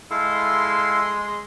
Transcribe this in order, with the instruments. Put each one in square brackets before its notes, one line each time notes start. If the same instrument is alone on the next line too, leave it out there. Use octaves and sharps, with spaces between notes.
[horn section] G#3 C6 [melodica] E4 A4 F5